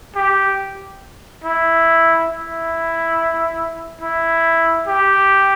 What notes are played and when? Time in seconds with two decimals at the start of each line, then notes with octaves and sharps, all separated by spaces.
0.16 G4
1.44 E4
2.29 E4
4.01 E4
4.87 G4